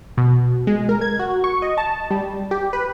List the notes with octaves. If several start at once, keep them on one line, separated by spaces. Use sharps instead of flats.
B2
G#3
A#4
G#6
F#4
C#6
D#5
A5
G3
G4
B4